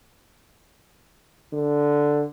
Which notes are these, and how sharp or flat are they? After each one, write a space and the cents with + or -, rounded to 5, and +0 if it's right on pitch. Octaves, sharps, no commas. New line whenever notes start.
D3 +0